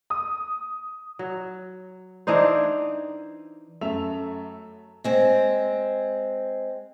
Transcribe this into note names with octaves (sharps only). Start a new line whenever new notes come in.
D#6
F#3
E3 D4 D#4 C5
F#2 A3 E5 F7
G#3 C4